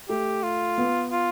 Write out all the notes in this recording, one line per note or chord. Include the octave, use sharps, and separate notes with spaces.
A3 G4
F4
B3
F4